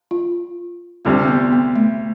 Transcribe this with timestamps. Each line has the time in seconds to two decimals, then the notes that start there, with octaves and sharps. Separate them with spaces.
0.11 F4
1.05 D2 C3 G3 C4
1.28 B3
1.52 B3
1.76 A3